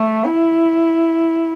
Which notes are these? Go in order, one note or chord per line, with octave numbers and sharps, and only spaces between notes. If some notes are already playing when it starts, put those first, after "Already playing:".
Already playing: A3
E4